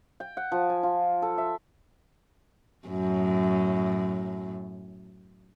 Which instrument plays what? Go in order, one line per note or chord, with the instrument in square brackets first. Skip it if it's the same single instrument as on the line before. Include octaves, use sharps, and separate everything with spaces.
[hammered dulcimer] G5
F#5
F3
G#5
F4
A4
E5
[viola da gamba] F#2 A2